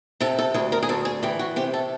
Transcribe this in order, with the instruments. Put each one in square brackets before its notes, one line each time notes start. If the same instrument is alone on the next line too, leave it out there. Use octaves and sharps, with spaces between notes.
[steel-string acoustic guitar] C3 A4
A4
D2 G#4
A#4
G#4
D2 A4
G#4
E3 G4
F#4
C3 G4
A4